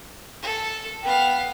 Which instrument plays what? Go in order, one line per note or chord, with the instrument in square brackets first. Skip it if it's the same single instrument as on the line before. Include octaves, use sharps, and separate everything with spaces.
[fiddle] A4
[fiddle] B3 F5 [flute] G5